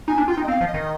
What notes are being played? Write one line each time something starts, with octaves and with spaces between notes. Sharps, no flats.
D#4 G#5
D4
F4 G5
D#4
D#5
C4 F5
F3
D#5
D#3